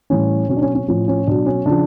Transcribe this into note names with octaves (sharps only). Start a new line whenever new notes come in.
A2 E3 G3 C#4
B2 F#3 C#4
D4
C#4
C#4
A2 F3 C#4
C#4
B2 F#3 D4
C#4
C#3 F3 D4